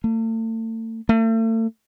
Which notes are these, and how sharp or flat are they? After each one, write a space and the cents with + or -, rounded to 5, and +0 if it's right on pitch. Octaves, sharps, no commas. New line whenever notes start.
A3 +40
A3 +40